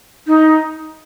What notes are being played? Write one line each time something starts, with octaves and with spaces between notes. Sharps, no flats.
D#4